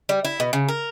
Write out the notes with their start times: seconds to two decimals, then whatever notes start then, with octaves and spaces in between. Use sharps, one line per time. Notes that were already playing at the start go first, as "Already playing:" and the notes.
0.09 G3
0.25 E4
0.40 B2
0.53 C#3
0.69 A#4